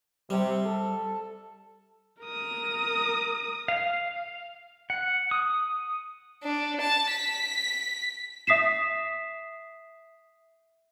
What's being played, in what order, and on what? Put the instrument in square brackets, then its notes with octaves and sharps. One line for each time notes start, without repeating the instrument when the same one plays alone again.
[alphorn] C3 [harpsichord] G3
[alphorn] A4
[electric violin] A#4 D#6
[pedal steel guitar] F5
F#5
D#6
[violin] D4
A5
B6
[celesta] E5 D#6 B6 C7 E7